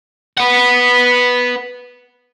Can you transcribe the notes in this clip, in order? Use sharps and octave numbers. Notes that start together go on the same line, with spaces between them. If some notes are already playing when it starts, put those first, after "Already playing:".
B4 F#5